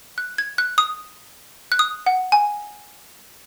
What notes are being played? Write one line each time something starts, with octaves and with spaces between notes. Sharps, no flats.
F#6
G#6
F#6
D#6
F#6
D#6
F#5
G#5